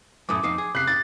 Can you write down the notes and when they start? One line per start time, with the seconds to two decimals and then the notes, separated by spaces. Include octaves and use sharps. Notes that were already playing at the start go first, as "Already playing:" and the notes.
0.29 F#2 A2 A3 D6 D#6
0.43 F2 D#4 F5
0.58 G#4
0.75 C3 F#6 C7
0.87 A6